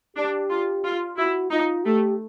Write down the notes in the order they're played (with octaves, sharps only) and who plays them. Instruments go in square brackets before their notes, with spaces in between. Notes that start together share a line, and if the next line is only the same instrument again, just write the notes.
[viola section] D4 [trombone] G4
[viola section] F4
F4
[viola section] E4 [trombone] F#4
[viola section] D#4 [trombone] F4
[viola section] A3 [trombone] G4